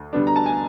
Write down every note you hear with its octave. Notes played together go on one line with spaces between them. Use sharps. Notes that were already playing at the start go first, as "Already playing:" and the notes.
Already playing: D2
D3 G3 B3 D4
A#5
A5
G#5